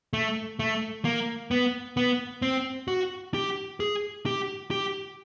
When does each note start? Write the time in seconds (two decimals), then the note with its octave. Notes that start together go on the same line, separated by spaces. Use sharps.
0.13 A3
0.59 A3
1.05 A#3
1.51 B3
1.97 B3
2.42 C4
2.88 F#4
3.34 G4
3.80 G#4
4.26 G4
4.71 G4